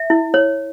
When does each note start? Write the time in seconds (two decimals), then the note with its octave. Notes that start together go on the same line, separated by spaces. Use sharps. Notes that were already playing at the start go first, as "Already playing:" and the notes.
Already playing: E5
0.10 E4
0.34 C#5